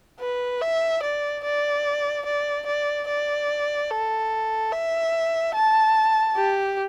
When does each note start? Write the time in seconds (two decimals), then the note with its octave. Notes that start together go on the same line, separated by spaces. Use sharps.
0.20 B4
0.61 E5
1.03 D5
1.44 D5
2.26 D5
2.67 D5
3.08 D5
3.90 A4
4.72 E5
5.55 A5
6.36 G4